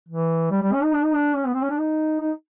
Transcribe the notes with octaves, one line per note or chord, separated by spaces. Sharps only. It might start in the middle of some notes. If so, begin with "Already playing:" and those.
E3
G3
G3
C#4
D#4
D4
D#4
D4
C#4
B3
C4
C#4
D4
D#4
D#4